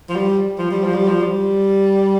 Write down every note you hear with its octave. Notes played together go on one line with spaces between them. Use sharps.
F3
G3
F3
G3
F3
G3
F3
G3